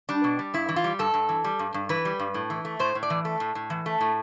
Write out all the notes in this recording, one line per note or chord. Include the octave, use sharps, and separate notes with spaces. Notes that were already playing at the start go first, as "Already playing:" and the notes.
G3 D4
B2
G3
G2 E4
E3
F4
G3
G2 A4
G2
E3
G3
G2
G2
E3 B4
G3
G2
A2
E3
A3
A2 C5
A2
D5
E3
A3
A2
A2
E3
A3
A2